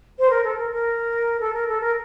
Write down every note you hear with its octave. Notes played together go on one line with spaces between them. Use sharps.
C5
A#4
A4
A#4
A#4
A4
A#4
A4
A#4